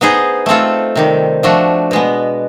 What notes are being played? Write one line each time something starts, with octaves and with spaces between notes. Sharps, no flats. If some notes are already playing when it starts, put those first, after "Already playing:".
B3 D#4 G#4 C5 D#5
A3 C4 F4 A4
C3 D#3 G3
F3 A3 D4 F#4
B2 G#3 B3